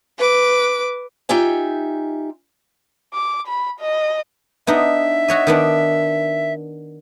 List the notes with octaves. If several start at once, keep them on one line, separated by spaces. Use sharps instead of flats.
B4 D6
D#4 F4 G4 E5 G#5
D6
B5
D#5
B3 D4 D#4 E5
F#4 C#5 D#5
D#3 B3 D4